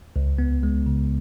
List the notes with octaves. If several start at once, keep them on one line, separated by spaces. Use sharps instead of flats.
C#2
B3
G#3
C#3